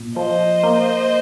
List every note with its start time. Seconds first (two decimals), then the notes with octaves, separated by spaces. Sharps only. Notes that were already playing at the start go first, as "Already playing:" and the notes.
Already playing: A#2
0.16 F3 C5 D#5
0.63 A#3